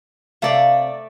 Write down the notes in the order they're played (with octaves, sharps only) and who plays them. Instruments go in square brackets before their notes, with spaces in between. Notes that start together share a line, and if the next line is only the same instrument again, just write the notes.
[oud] C3 F5 [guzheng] A3 D5